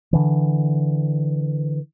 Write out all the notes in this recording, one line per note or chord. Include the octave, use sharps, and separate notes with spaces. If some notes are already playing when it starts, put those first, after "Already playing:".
D3 E3